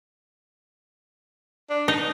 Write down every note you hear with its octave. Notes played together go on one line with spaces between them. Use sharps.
D4
D#4